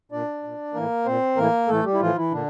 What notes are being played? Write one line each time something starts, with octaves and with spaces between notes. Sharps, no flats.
A#2 D4 D5
A#2
A2 E3 A#3 A#4
A#2 C4 C5
A2 E3 A#3 A#4
A2 E3 A3 A4
G3 G4
E4
A2 E3 F3 F4
E3 E4
A#2 D3 D4